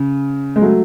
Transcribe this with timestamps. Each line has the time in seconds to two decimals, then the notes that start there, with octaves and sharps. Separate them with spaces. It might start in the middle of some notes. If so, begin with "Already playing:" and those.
Already playing: C#3
0.56 G#3
0.62 F#3 A3